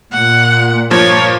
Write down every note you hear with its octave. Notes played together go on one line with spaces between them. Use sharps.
A#2 F#5
G2 F3 A#3 C#5